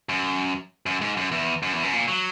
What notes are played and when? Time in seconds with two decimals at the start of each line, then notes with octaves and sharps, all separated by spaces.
0.09 F#2
0.86 F#2
1.02 G#2
1.17 F#2
1.32 E2
1.63 F#2
1.73 E2
1.83 F#2
1.93 A#2
2.08 F#3